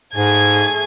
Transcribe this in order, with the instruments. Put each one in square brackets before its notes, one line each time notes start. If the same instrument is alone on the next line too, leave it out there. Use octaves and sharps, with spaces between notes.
[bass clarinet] G#2 [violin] A3 G#6 [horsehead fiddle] G#4